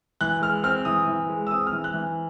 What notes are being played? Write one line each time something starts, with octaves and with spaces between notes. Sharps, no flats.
E3 F#6
G#3 F6
C4 F6
E3 D#6
E3
G#3
E6
C4 D#6
F6
E3
F#6
E3